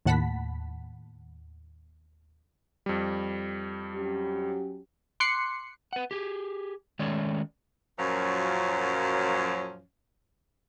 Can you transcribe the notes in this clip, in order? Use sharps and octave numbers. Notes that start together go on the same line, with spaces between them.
D#2 A2 F#5 A5 B5 B6
F2 G3
F#3 C#4 G4
C6 D6 F#6 C7 C#7
B4 F#5
G4 G#4
D#3 G#3 A3 C#4 C#5 D5
F#2 A#2 F3 F#3 C#4